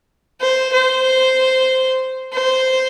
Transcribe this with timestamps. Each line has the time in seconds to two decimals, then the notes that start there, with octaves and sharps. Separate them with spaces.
0.41 C5
0.73 C5
2.33 C5